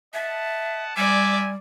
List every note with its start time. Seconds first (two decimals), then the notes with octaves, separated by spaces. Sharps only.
0.14 D#5 E5 F#5 A5
0.96 G3 C4 D5 E5 G#5 D6